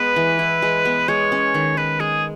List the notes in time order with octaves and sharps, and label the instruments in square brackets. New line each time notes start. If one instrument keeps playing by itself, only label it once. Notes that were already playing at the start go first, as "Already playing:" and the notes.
Already playing: [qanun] G#3 B3 [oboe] B4
[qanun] E3
E4
G#3
B3
[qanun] G#3 [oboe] C#5
[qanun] C#4
D#3
[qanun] D#3 [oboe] B4
[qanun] G#3 [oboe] G#4